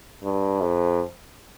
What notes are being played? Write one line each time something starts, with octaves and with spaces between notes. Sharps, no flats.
G2
F2